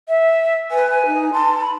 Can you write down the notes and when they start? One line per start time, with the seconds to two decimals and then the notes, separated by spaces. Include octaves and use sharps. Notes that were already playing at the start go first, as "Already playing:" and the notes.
0.09 E5
0.71 B4 G#5
0.90 G#5
1.06 D#4
1.33 A5 C6
1.61 B5